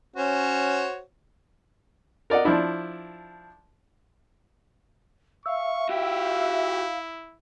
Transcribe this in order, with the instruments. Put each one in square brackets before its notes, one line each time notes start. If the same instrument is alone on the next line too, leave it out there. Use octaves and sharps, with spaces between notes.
[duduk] C#4 [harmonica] F#4 C5 C#5
[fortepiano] A#4 D5 D#5 F#5
F3 D4 E4
[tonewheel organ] E5 [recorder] F5 [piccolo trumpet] C#6
[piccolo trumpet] E4 [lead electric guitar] F#4 G4